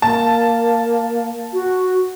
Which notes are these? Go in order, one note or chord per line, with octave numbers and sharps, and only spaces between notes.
A#3 A5
F#4